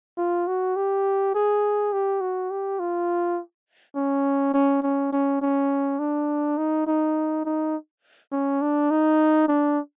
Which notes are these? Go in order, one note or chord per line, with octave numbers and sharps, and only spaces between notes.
F4
F#4
G4
G#4
G4
F#4
G4
F4
C#4
C#4
C#4
C#4
C#4
D4
D#4
D#4
D#4
C#4
D4
D#4
D4